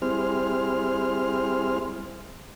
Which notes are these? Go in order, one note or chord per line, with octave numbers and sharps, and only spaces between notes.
G3 C4 E4 G#4 C5 F6